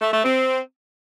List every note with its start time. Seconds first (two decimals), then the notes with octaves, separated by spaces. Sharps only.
0.01 A3
0.13 A3
0.24 C4